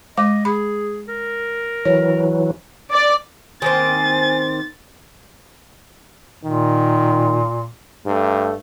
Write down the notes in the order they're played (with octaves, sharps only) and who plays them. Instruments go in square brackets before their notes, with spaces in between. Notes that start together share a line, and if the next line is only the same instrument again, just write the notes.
[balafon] G#3 D6 [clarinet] D#5
[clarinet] G#4 [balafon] B5
[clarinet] A#4
[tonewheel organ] E3 F#3 [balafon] C#5
[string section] D5
[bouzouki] D#3 A#3 C4 [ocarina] G#5 [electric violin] A6
[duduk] A#2 [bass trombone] D#3
[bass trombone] G2 [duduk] A3